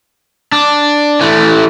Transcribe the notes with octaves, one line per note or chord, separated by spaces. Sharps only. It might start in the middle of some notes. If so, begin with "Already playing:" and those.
D4
E3 A3